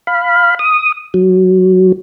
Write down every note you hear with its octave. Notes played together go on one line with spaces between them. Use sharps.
F5 B5
D#6
F#3